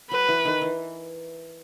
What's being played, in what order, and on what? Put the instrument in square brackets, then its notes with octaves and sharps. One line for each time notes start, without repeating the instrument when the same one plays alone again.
[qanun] F#3 [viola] B4
[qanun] E3
D#3
E3